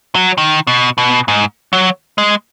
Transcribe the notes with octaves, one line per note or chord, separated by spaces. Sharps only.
F#3
D#3
B2
B2
G#2
F#3
G#3